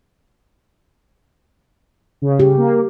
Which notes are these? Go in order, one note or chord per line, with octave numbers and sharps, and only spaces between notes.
C#3
G4
A#3